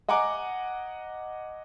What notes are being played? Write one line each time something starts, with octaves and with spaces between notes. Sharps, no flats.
D#5 F#5 G#5 A#5 D6